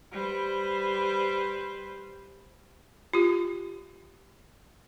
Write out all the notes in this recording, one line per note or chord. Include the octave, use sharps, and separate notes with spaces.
G3 B4 C5
F4 G4